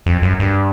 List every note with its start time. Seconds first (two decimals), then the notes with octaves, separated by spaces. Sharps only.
0.06 F2
0.22 F#2
0.40 G2